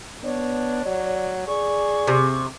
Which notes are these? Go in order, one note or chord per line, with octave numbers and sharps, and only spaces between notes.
B3 D4 C#5
F#3 D5
G#4 D5 C#6
C3